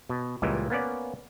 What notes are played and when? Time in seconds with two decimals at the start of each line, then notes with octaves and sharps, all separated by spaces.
0.09 B2
0.42 C#2 A#2 E3 G3 G#3
0.70 A#3 B3 C#4 D5